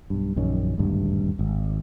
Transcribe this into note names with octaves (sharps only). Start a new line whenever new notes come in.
B1 G2
A#1 F#2 D#3 C#4
D#1 G#1 D2 G2
G#1